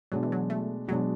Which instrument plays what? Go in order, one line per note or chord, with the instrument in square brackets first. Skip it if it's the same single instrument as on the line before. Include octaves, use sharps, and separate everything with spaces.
[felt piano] B2 G#3 D4 [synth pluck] F#3
[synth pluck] E3
F#3
A3
[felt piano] B2 G#3 D4 [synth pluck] F#3